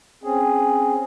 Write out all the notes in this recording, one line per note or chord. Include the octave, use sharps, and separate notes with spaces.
C4 C#4 G#4